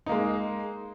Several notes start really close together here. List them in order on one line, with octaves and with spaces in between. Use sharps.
D#4 A#3 G#3